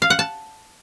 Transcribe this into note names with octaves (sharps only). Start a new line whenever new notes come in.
F5
F#5
A5